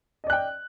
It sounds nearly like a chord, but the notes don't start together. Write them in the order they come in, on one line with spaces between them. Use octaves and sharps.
D#5 D5 F#6 G5